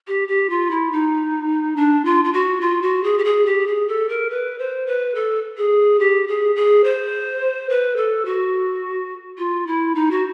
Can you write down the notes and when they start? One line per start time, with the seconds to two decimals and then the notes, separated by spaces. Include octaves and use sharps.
0.08 G4
0.28 G4
0.50 F4
0.71 E4
0.92 D#4
1.76 D4
2.05 F4
2.25 F4
2.33 F#4
2.61 F4
2.82 F#4
3.04 G#4
3.18 G4
3.25 G#4
3.46 G4
3.67 G#4
3.88 A4
4.09 A#4
4.30 B4
4.59 C5
4.87 B4
5.15 A4
5.58 G#4
5.99 G4
6.28 G#4
6.56 G#4
6.84 C5
7.69 B4
7.97 A4
8.25 F#4
9.38 F4
9.67 E4
9.95 D#4
10.11 F#4